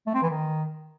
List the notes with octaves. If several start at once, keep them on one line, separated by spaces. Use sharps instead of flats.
A3
C4
E3
D#3